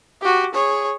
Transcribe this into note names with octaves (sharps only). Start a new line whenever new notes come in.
F#4 G4
G#4 C#5